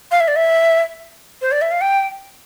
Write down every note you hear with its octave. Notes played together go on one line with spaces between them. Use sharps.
F5
E5
D5
E5
C5
D5
E5
F5
G5